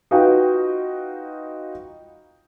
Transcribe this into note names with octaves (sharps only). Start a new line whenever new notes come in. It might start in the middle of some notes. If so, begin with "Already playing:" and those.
D#4 F4 F#4 B4 F5 G5